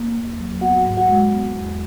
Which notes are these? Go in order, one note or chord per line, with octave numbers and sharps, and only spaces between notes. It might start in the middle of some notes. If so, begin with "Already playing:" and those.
Already playing: A#3
E2
F#3
B3 F#4 F#5
G#2
F#4 F#5
G#3
B3
E2